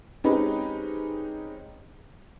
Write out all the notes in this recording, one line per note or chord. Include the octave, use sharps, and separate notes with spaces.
G#3 C4 C#4 D#4 G4 B4